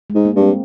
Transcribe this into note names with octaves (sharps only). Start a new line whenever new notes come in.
G#3
G#2
A#3
G2
C4